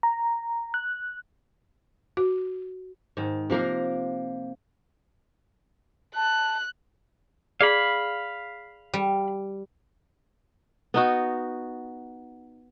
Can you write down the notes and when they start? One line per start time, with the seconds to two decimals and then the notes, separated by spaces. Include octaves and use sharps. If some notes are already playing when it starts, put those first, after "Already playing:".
0.03 A#5
0.74 F#6
2.17 F#4
3.17 G#2 D#3
3.50 C3 F3 A#3 A#4
6.16 A5 F#6
7.61 G#4 D5 F5 B5
8.94 G3
10.94 B3 D#4 F#4